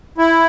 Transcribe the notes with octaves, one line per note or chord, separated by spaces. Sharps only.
E4